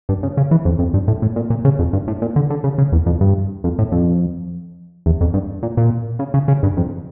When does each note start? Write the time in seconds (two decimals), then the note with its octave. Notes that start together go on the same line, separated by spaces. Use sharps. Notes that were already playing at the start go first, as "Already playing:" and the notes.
0.09 G2
0.23 C#3
0.37 C#3
0.51 E3
0.65 F2
0.79 F2
0.94 G2
1.08 A2
1.22 A2
1.36 A#2
1.50 A#2
1.65 C#3
1.79 F2
1.93 G2
2.07 A2
2.22 A#2
2.36 D3
2.50 D3
2.64 C#3
2.78 C#3
2.92 E2
3.06 F2
3.21 G2
3.64 F2
3.79 A2
3.92 F2
5.06 E2
5.21 F2
5.34 G2
5.63 A#2
5.77 A#2
6.19 C#3
6.34 C#3
6.48 C#3
6.63 G2
6.77 F2